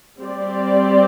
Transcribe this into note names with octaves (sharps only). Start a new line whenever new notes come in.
G3 C4 G4 D5